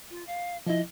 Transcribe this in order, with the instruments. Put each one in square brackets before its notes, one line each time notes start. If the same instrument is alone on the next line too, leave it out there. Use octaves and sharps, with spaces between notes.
[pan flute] F4
F5
[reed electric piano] F3 E4 [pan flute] D#5